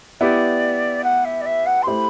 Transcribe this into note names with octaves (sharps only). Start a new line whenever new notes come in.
B3 E4 G4 B4 D5
F#5
E5
D5
E5
F#5
C6
A3 E4 G4 C5 B5